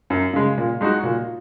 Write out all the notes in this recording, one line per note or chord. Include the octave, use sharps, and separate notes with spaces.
F#2
C#3 G#3
A#2
G#3 D#4 F#4
A#2